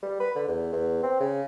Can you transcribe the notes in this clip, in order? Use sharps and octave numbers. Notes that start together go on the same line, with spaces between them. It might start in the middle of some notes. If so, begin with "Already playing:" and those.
G3
B4
D3
E2
E2
C4
C#3